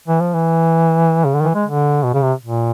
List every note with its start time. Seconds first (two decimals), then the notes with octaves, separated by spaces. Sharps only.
0.08 E3
0.21 F3
0.34 E3
1.25 C#3
1.35 D3
1.41 D#3
1.44 E3
1.54 G#3
1.65 D3
2.03 B2
2.14 C#3
2.23 C3
2.43 A#2